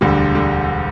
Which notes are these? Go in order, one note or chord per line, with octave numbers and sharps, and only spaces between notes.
E1 D2 D3 G3
D3 G3